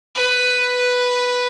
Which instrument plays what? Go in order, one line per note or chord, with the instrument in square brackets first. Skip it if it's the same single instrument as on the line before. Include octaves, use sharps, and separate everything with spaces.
[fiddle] B4